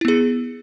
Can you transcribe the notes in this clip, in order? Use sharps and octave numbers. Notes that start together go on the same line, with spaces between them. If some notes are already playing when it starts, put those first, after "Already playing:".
B3 E4 G#4